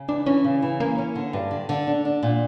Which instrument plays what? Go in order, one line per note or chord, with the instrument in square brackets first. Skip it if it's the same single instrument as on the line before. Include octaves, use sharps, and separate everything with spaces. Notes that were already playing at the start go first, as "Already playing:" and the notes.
Already playing: [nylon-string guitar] C#3
[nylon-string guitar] E3 [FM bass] D4
[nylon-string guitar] E3 [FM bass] C#4
[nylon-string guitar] C#3
E3
[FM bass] A#3 [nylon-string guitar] C#4
[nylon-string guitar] C#4
D3
G2
D3
D3
D4
D4
A#2